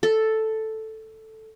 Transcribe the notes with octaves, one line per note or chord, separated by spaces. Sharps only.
A4